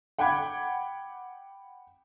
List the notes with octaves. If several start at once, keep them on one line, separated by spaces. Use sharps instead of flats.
F#5 G5 B5 D6 G#6